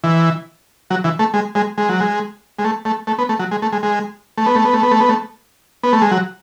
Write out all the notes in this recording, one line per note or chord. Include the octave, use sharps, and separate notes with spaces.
E3
F#3
E3
A3
G#3
G#3
G#3
F#3
G#3
G#3
A3
A3
A3
B3
A3
F#3
G#3
A3
G#3
G#3
A3
B3
A3
B3
A3
B3
A3
B3
A3
B3
A3
G#3
F#3